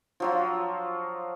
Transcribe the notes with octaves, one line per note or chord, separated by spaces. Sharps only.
F3 F#3 F4